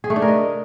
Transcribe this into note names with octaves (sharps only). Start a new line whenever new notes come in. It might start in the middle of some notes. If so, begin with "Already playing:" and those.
G#4
A3
D4
A#4
D#5